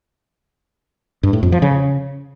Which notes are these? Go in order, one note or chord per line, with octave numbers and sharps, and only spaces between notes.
G2
A2
F2
F3
C#3